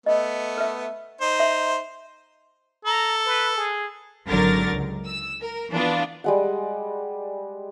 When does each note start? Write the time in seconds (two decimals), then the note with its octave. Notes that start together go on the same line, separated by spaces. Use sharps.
0.06 A3 B3 D#5
0.58 B4 E5
1.21 D#4 C5
1.40 E5 C6
2.85 A4 A#5
3.26 B4
3.56 G#4
4.26 G#1 D3 F#3 A#4 A6
4.71 C#2
5.05 E6
5.40 A#4
5.71 E3 B3 D4 F4
6.24 G3 G#3 F#5